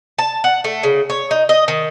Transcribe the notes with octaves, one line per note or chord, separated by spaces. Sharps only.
A5
F#5
A3
C#3
C#5
D#4
D#5
D#3